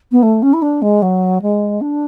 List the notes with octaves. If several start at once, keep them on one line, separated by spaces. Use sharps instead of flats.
B3
A3
C#4
E4
D4
G#3
F#3
G#3
D4